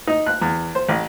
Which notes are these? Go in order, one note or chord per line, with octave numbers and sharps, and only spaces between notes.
D#4
F#6
E2
C5
A1